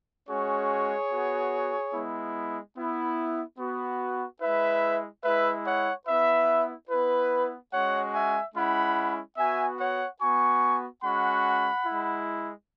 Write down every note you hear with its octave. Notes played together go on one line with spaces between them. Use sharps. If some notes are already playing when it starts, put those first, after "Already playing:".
G#3 C#4 F#4 G#4 C#5
B3 F#4
G#3 B3 E4
B3 E4
B3 F#4
G#3 E4 B4 E5
G#3 E4 B4 E5
C#5 F#5
B3 E4 B4 E5
B3 E4 B4
G#3 C#4 F#4 C#5 F#5
E5 G#5
G#3 C#4 E4 F#5 B5
B3 F#4 E5 G#5
C#5 F#5
B3 F#4 G#5 C#6
G#3 C#4 F#4 F#5 B5
G#3 E4